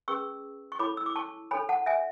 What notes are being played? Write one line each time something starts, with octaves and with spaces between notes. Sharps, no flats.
C#4 G#4 B4 C#6 E6
C#6
E4 A4 C#5 B5 D6
E6
D6
A5 C#6
D4 A4 C#5 G#5 B5
F#5 A5
E5 G#5